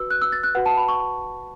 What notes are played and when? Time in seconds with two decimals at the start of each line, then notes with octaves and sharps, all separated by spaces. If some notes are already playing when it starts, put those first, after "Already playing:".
Already playing: F#4 B4 E6
0.10 F#6
0.22 E6
0.32 A6
0.43 F#6
0.55 F#4 B4 F#5
0.66 A5
0.77 B5
0.88 C#6